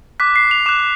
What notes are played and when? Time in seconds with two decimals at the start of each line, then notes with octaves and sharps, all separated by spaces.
0.20 D6 F#6 B6
0.36 C7
0.51 F7
0.66 D6 F#6 E7